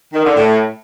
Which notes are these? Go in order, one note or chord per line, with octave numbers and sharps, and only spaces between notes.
D#3
D3
A2